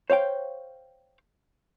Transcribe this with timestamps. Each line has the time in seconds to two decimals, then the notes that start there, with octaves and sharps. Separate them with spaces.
0.10 C5 C#5 F5 G5